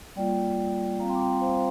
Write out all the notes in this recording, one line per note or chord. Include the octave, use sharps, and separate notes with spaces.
G3 A#3 F4 D5 G5
G3 C4 F4 F5 A#5
G5 C6
D6
G5 C6
C5 F5